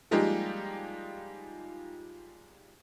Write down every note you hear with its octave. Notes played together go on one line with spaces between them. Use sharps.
F3 G3 G#3 A#3 D#4 G4